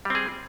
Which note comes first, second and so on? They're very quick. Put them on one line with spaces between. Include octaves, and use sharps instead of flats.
G3 C4 G#4